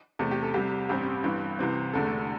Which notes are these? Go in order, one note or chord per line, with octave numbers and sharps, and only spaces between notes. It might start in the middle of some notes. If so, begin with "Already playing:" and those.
E2 C3 A3 A4
G4
A4
C2 C3 G3 G4
A1 G2 G3 C4 G4
G1 G2 E3
C2 C3 E3 C4
E1 E2 D3 A3 A4